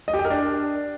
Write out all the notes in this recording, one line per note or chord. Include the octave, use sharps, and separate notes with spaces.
D#5
G4
G5
A#4
D4